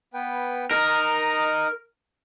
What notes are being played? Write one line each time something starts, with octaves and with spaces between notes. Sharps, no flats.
B3 B4 G5
D#4 A#4 D#5